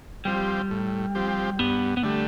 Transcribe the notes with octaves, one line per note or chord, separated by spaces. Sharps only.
F3 G3 C4 G4
A2
F3 C4 G4
G2 B3
B3
D3 G3 A3